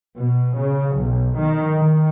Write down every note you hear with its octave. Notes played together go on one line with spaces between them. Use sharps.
B2
C#3
B1
D#3
D#3